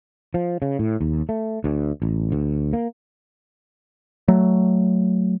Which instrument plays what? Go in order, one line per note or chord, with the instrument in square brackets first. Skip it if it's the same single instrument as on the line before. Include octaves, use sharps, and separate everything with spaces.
[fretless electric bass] F3
C#3
A2
D#2
A3
D2
A1
D2
A#3
[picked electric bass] F#3 A3